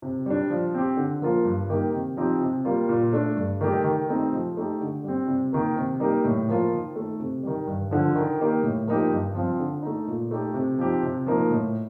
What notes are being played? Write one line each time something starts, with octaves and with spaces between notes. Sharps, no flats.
C3
G3 D4
F3
C4 G4
D3
F3 A#3 F4
G2
D#3 A#3 D#4 G4
C3
F3 C4 D#4 G4
C3
G3 A#3 F4
A#2
A3 D4
G2
D#3 A3 D#4 G4
D#3
A3 C4 D#4 G4
F3
A3 D#4 G4
D3
G3 C4
C3
D#3 A#3
C3
G3 A#3 D#4 G4
A2
F3 A#3 F4
D#3
A3 D#4
C3
D#3 G3
G2
D3 F3
D#3
A#3 D#4 G4
A2
F3 A#3 D#4 G4
G2
F3 C4 F4
D3
A3 D#4
A#2
A3 D#4 G4
C3
F3 C4 D#4 G4
C3
F3 A#3 D#4
A2